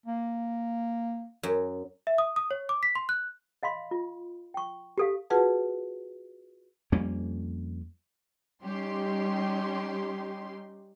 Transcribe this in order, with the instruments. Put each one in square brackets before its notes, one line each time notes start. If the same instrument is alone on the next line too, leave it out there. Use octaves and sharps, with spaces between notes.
[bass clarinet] A#3
[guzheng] F#2
[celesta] E5
D#6
D#6
C#5
D6
B6
C6
F#6
[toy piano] D#5 F5 B5 C6
F4
G5 C#6
G4 A4 F5
[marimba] F4 F#4 G#4 B4 F#5 A5
[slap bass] F2 G3 A#3 C#4
[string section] G3 C#4 D#4 G4 C6